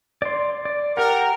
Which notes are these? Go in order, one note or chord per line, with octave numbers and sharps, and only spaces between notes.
D5 C6
D5
G4 A#4 F#5